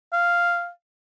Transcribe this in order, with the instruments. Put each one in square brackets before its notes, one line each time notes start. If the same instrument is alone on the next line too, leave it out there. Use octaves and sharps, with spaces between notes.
[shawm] F5